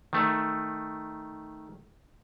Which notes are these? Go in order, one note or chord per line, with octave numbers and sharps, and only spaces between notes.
D#3 A3